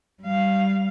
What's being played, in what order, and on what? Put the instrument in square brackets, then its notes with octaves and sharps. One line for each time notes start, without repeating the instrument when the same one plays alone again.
[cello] G3 F5